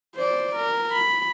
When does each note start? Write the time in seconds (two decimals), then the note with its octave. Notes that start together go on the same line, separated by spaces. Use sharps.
0.15 C5 D5
0.56 A#4
0.92 B5